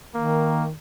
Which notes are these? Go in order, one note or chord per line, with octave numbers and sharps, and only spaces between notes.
D#3 A#3